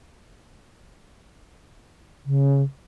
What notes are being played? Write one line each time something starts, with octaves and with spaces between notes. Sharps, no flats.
C#3